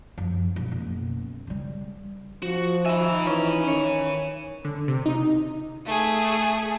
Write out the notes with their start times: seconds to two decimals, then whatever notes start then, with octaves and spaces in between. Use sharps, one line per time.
0.18 F#2 F3
0.56 B1
0.71 F#1 B2
1.47 C#3 G3
2.43 F3 F#4
2.86 D#4 E5 G#5 B5
3.27 E3 C#4
3.68 D#3 C#5
4.64 D3
4.88 C3
5.06 D#4
5.86 A3 G#4